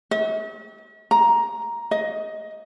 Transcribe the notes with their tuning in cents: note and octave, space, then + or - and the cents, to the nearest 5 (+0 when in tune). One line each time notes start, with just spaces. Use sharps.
E5 -45
A#5 +10
D#5 +15